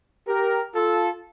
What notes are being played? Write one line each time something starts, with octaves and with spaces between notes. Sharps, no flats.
G4 A#4
F4 A4